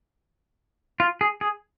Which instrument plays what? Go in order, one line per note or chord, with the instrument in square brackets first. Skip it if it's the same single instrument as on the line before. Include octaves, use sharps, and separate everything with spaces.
[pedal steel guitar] F4
G#4
G#4